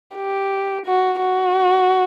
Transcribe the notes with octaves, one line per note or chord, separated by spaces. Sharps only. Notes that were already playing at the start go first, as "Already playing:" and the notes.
G4
F#4
F#4